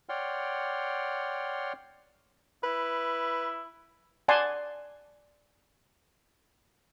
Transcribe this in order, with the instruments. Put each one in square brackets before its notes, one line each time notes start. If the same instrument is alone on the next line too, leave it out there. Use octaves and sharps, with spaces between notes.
[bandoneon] C#5 D5 F#5 G5 C6 F6
[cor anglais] E4 [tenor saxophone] B4
[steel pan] D5 F#5 G#5 A5 C6